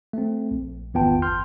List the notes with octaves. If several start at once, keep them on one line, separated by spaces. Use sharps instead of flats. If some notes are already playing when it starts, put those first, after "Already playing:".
A3 C4
A#1
G#1 E2 B3 F4 G5 A5
G1 C6 F6 G6